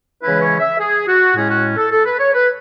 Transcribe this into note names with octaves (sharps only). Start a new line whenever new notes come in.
C#3 E3 G#3 C#4 E4 B4
C#5
E5
G#4
F#4
A2 G#3 C#4 G#4
F#4
A4
A4
B4
C#5
B4